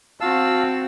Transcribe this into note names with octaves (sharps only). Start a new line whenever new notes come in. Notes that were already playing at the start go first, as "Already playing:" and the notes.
C4 F#4 F5 A5 E6